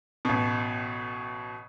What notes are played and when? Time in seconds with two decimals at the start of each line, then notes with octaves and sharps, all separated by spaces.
0.25 A1 B2